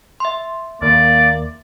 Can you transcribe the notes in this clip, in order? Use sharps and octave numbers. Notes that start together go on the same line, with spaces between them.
E5 C6
D#2 A#3 D5